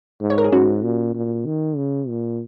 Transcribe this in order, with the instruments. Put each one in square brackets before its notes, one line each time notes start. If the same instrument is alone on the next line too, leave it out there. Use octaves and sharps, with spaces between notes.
[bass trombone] G#2
[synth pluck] C#5
A#4
G#4
[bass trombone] G#2 [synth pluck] C#4 F#4
[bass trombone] A#2
A#2
D#3
C#3
A#2